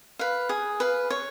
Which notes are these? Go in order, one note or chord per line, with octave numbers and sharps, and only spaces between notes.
B4 F5
G#4
B4 F5
C#5